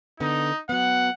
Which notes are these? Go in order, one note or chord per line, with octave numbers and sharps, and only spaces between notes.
D3 B3 D#4
F#3 B3 F#5